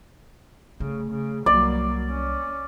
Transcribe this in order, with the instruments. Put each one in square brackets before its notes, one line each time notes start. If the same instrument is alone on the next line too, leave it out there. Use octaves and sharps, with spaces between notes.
[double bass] C#3 [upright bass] A3
[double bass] C#3
[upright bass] C2 [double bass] F#3 A#3 [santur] D5
[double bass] C#4